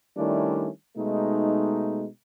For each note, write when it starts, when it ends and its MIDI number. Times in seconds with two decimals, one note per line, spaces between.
0.17 0.68 51
0.17 0.68 55
0.17 0.68 57
0.17 0.68 61
0.17 0.68 62
0.17 0.68 64
0.97 2.05 47
0.97 2.05 56
0.97 2.05 57
0.97 2.05 63